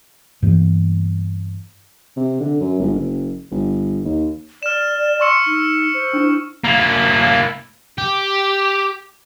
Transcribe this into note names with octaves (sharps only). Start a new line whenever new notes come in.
G2 E3 A#3 B3
C3
D3
F#2
G1
F#1
G1
D#2
D5 F6 E7
C6 C#6 E6 C#7
D#4
C5
D4 E4
A#3 E4
G4